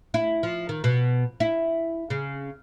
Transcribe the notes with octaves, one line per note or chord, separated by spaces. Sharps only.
E4
F3
D#3
B2
E4
C#3